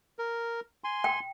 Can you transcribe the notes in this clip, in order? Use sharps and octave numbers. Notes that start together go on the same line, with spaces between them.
A#4
G#5 C6
G5